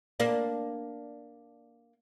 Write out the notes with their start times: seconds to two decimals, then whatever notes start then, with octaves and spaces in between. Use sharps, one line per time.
0.20 A#3 D4